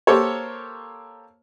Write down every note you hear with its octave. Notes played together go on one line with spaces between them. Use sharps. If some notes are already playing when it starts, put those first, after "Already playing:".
A#3 G4 A4 A#4 C5 C#5